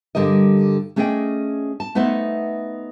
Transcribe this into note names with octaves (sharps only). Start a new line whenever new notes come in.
G2 D3 G3 A#4 D#5
A3 C#4 G#4 D5 D#5 G5
A5
A3 B3 D#4 C5 E5 F#5